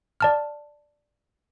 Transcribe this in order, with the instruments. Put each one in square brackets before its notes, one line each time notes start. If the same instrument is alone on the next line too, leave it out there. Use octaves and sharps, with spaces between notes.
[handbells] D5 A5 F6